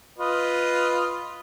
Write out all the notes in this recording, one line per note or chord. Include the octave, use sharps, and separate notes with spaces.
F4 B4 D#5